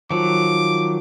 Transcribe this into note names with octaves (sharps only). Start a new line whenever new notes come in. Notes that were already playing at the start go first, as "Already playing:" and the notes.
D#3 F3 F#3 D6